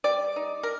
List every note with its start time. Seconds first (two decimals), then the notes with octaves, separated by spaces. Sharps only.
0.04 G3 D5
0.36 D#4
0.63 A#4